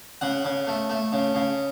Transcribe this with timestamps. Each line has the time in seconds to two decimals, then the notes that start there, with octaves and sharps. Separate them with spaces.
0.21 C#3 F#5
0.45 C#3
0.67 A3
0.90 A3
1.12 C#3
1.35 C#3